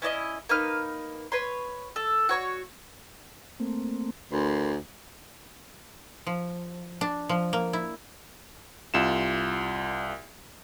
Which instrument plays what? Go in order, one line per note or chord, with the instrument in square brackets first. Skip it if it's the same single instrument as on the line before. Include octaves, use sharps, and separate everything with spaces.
[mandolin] C#4 E4 D5 D#5
A#3 D#4 B4 F6
B4 C#5 C6
A4
F#4 C#5 C#6
[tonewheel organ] A3 A#3 C4
[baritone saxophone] D2 [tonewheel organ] A#4 B5 C6
[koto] F3
D4
F3
A#3
E4
[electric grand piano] C2 F4 E7